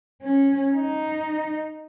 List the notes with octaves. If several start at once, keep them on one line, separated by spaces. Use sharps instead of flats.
C#4
D#4